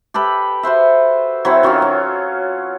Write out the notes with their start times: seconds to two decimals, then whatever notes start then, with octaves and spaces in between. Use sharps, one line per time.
0.14 G4 A4 B4 B5
0.63 F#4 B4 C5 E5
1.45 F#3 C4 E4 C#5
1.63 D#3 F#3 C#4 F4
1.82 C#4